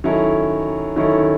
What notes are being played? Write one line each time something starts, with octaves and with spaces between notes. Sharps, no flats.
D#3 F#3 C#4 E4 A4
D#3 F#3 C#4 E4 A4